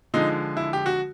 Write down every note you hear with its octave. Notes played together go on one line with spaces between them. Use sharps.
D3 F3 G#3 D#4
E4
G4
F#4